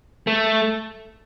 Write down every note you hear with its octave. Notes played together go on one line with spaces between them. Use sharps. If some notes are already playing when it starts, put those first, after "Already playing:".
A3